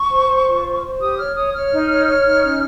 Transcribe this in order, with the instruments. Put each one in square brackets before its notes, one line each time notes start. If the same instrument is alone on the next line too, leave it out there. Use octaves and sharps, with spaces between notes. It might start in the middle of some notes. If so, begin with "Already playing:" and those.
Already playing: [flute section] C#6
C5
C5
F4
C5
C5
G4 D#6
C#5 F6
C#5 D#6
C#5 F6
D#4
C#5
C#5
D#4
C#4